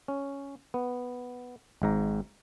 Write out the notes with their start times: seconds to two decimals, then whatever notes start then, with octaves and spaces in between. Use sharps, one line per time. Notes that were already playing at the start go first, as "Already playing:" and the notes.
0.08 C#4
0.74 B3
1.82 G#1 G#2 A#5